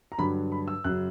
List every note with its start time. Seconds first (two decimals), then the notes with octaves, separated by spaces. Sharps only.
0.12 A#5
0.18 G2 D3 F#3 B5
0.52 B5
0.68 E6
0.84 F#2 C#3 F#3 F#6